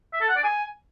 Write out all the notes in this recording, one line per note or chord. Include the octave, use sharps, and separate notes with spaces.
E5
A4
F#5
D5
G#5